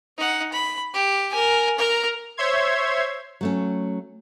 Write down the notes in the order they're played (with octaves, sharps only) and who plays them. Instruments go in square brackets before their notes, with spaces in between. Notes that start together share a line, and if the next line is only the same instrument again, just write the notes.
[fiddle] D#4 F#5
B5
G4
A#4 G#5
A#4 A#5
[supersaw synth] C5 C#5 E5 C6 G#6
[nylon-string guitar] F#3 A3 C#4